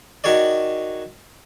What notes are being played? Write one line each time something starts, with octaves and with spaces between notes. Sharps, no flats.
D#3 F#4 G#4 C#5 D5